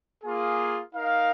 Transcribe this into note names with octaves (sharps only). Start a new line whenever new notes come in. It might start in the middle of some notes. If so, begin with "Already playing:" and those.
A#3 F4 G#4
D#4 A#4 F5